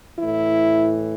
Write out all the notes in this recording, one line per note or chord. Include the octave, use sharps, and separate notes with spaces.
A2 E3 E4